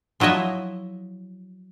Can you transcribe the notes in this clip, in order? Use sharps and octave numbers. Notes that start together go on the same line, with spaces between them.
F3 F#3 E4 D#5 E5